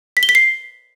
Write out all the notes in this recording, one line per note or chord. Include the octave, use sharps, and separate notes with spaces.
B6
G7
B6
C7